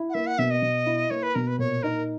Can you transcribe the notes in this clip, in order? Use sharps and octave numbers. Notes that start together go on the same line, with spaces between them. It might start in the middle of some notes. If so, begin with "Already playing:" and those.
Already playing: E4
F#5
A#3 E5
F#5
B2 E5
D#5
B2
E4
A#3 C#5
B4
B2 A#4
B4
A#2 C#5
D#4 A#4